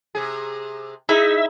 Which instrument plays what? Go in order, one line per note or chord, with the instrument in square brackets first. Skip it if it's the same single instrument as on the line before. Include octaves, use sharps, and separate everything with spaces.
[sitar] C3 G#4
[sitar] D#4 [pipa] E4 [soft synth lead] G#4 [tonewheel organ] E5